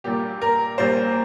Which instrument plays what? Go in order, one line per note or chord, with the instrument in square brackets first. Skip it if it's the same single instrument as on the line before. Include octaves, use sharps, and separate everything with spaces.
[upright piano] A#1 A#2 G3 A#3 G4
A#4
A#1 A#2 G3 A#3 C5